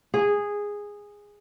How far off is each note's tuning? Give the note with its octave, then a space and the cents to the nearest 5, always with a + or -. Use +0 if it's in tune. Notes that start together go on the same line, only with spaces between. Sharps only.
G#4 -10